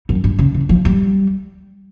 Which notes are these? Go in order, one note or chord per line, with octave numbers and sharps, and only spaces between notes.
F#2
G2
C#3
E3
F3
G3